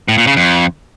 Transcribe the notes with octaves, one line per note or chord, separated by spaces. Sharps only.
A2
A#2
C#3
F2